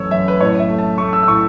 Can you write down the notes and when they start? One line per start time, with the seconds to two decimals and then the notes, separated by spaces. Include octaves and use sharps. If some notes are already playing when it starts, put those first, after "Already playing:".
Already playing: F#2 E3 A3 C#5 E6
0.11 F#2 E5
0.28 B4
0.40 A2 C#5
0.59 E5
0.69 A3
0.79 A5
0.98 A3 C#6
1.13 E6
1.23 E6
1.28 A2 C#6